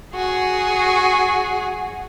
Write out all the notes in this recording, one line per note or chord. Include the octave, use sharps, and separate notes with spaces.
F#4 G#4